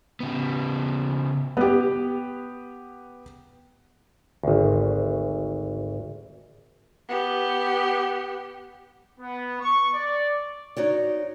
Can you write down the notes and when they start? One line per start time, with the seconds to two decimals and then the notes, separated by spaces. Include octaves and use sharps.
0.20 C#3 B3
1.57 B3 G4
4.44 G#1 D2
7.09 B3 G4
9.19 B3
9.60 C#6
9.93 D5
10.77 D#4 F#4 C#5 D5